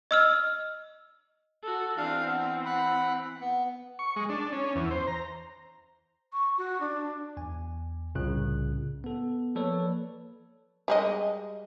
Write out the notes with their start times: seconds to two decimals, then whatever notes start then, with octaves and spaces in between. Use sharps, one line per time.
0.11 D#5 E6 F6
1.63 F#4 A4
1.98 E3 C4 D4 F5
2.26 B3
2.65 F#5 B5
3.41 B3
3.99 C#6
4.16 G#3
4.29 D4
4.53 C#4
4.75 E2
4.91 C5
5.07 A#5
6.33 C#6
6.58 F#4
6.81 D4
7.37 E2 G#5
8.15 C2 A2 C#3 F4 F#6
9.04 B3 A4
9.55 F3 A#3 A4 B4 C#5 D5
10.88 G3 G#3 D#5